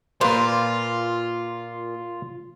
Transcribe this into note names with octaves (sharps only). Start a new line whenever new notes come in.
A#2 A#3 F4 B4 C5